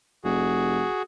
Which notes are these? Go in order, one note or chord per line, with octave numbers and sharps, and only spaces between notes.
F1 F#4 G#4